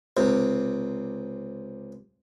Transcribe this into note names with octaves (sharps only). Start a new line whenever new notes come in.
C#2 C3